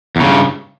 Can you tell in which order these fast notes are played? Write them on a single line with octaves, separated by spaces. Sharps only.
E2 C#3 G2